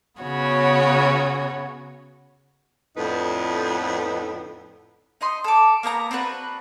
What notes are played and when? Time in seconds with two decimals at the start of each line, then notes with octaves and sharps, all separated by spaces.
0.20 C#3 B3 F#4 C#5
2.97 F2 A2 D3 B3 D#4 B4
5.21 D#4 D#5 C6
5.44 A4 D6
5.83 A#3 B3 G5 A#5
6.11 C4 D4 F#4 B4